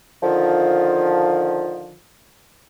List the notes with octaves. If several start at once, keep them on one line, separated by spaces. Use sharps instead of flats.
D3 D#3 F3